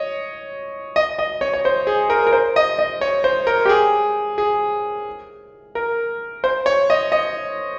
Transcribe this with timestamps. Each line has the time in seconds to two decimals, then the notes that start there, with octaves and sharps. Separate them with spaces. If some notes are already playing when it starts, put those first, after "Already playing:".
Already playing: C#5 D#5
0.96 D#5
1.19 D#5
1.41 C#5
1.54 C#5
1.65 C5
1.87 G#4
2.10 A#4
2.27 A#4
2.33 C5
2.56 D#5
2.79 D#5
3.01 C#5
3.24 C5
3.47 A#4
3.65 G4
3.69 G#4
4.38 G#4
5.75 A#4
6.44 C5
6.66 C#5
6.90 D#5
7.12 D#5